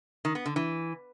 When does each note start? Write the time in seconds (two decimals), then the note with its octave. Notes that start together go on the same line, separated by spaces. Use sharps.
0.25 D#3
0.35 B3
0.46 D3
0.56 E3